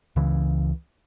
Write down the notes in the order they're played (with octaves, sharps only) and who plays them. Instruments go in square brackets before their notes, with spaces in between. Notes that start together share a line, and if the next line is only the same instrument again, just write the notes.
[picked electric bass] C#2 C#3 E3